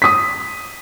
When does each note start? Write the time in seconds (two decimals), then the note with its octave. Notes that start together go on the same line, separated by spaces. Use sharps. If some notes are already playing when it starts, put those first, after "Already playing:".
0.02 D#6 B6